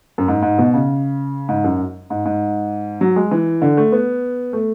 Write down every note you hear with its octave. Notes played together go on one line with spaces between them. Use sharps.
F#2
G#2
G#2
B2
C#3
G#2
F#2
G#2
G#2
F#3
G#3
E3
D3
A3
B3
A3